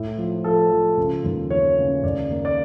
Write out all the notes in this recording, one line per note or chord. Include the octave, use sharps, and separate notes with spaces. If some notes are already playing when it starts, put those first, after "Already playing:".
Already playing: A2
F3
F3 A4
F3
C#3
D#2
E3 C#5
C#3
D#2 D5
A#3
D5